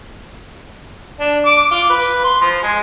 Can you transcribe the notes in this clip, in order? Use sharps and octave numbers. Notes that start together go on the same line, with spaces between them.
D4
D6
F4
B4
C6
F3
G#3